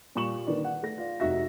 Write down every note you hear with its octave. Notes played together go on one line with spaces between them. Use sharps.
A#2 G3 C#6 E7 F#7
D3 D#3 B4 D5
F#5
A3 A#6
F4 D5
F1 D#4 F#4 E5 A#6